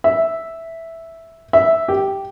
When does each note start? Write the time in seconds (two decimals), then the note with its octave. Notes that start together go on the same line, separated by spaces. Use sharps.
0.04 E5
1.53 E5
1.88 G4